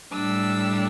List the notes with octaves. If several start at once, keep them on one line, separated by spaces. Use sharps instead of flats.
A2 G3 D4 E6